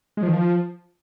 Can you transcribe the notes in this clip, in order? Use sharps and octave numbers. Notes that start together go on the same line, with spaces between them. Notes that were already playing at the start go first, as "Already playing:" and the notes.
G#3
F3
D#3
F3